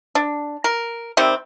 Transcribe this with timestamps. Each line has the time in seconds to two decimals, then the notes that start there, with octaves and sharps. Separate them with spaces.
0.15 D4
0.64 A#4
1.17 C3 D#3 G3 C4